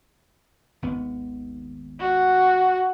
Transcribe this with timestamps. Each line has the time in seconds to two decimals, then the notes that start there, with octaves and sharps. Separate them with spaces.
0.82 G#1 D#2 B3
1.99 F#4